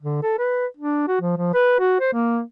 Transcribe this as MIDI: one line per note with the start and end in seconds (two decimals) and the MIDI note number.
0.01 0.22 50
0.23 0.37 69
0.38 0.66 71
0.77 1.06 62
1.07 1.19 66
1.21 1.37 53
1.37 1.53 53
1.54 1.76 71
1.79 1.99 66
2.00 2.11 72
2.13 2.41 58